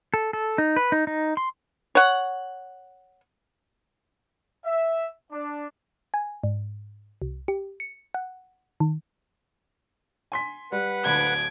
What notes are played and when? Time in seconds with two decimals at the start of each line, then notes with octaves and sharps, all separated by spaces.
0.14 A4
0.33 A4
0.58 D#4
0.76 B4
0.92 D#4
1.07 D#4
1.37 C6
1.95 C#5 F#5
4.65 E5
5.31 D4
6.14 G#5
6.44 G#2
7.22 C2
7.48 G4
7.80 C#7
8.14 F#5
8.80 D#3
10.32 G#5 C6 B6
10.72 G3 B4 F#5
11.05 D1 D3 B5 G#6 D7